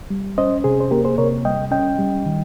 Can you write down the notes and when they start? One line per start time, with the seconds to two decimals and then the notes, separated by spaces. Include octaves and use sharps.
0.10 G3
0.38 C#4 C5 D#5
0.64 C3 G#4 C5
0.81 C5
0.91 A#3 G4 A#4
1.05 G#4 C5
1.18 C3 A#4 C#5
1.45 G3 D#5 G5
1.71 C#4 D#5 G5
1.99 G3
2.26 D#3